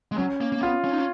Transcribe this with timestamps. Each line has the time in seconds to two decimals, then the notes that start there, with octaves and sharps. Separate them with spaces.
0.12 G#3
0.17 F#3 C#4
0.41 A#3
0.52 A#3
0.62 B3 F4
0.84 C#4
0.92 D#4
0.98 C#4